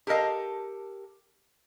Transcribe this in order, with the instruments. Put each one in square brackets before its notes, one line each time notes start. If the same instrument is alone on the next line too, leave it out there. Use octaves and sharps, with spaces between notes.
[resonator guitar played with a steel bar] G4 A4 A#4 D#5 F5